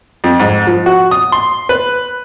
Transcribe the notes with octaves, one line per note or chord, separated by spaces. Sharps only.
F2
G#2
F3
F#4
D#6
C6
B4